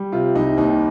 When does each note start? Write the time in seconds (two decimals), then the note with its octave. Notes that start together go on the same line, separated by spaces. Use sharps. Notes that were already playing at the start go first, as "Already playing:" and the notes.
Already playing: G3
0.12 C3 F4
0.35 C2 D#4
0.57 D#2 D#4